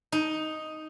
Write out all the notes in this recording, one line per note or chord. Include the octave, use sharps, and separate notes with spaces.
D#4